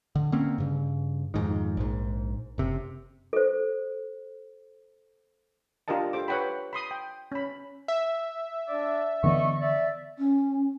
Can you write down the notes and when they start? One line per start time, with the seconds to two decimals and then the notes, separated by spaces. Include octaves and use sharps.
0.16 D3
0.32 D3 A#3 C4 C#4
0.58 G2 C#3
1.34 F2 G#2 D#3
1.77 A#1 G#2
2.58 F#1 C3
3.33 A4 C5
5.88 D4 F4 G4 A#4 D#5 A5
6.13 G4 A4 C5 D6
6.28 B4 C#5 F#5 G5 B5
6.73 B5 C6 D#6
6.91 G5
7.32 C#4 B5
7.88 E5
8.68 D4 D5
9.24 D3 E3 B3 D5 D#5 C#6
9.61 D5 E5
10.19 C#4